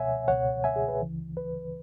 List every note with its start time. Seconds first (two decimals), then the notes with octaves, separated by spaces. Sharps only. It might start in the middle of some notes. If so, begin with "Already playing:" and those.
Already playing: C#2 B2 C#5 E5 F#5 G#5
0.28 C#2 B2 C#5 F#5
0.64 E5 G#5
0.76 G#4
0.88 B4
1.00 C#2 C#3 E3
1.37 B4